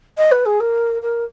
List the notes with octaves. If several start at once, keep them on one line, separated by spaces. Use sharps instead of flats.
D#5
B4
G#4
A#4
A#4